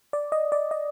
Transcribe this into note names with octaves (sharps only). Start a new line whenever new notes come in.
D5
D#5
D5
D#5